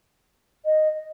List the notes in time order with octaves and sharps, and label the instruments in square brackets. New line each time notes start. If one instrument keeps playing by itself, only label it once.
[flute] D#5